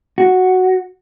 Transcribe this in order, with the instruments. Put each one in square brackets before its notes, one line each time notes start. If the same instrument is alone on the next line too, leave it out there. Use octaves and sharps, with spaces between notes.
[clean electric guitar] F#4